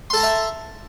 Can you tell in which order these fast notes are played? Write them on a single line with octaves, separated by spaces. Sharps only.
C6 A4 A5 A#5 E5